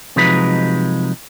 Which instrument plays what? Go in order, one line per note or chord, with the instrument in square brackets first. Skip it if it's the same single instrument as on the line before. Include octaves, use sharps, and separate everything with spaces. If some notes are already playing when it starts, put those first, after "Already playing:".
[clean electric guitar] C3 F3 F#3 G#3 D#4 B4